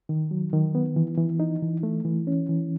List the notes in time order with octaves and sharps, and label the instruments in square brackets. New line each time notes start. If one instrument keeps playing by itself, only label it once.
[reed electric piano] D#3
F#3
D#3
B3
E3
E3
D#4
E3
A3
E3
C#4
E3